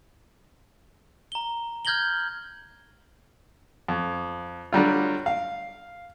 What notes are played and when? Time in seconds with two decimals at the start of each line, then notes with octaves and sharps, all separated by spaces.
1.32 A#5 G7
1.85 F6 G6 G#6 A#6 F#7 G7
3.88 F2
4.73 D3 F#3 G3 F4
5.26 F5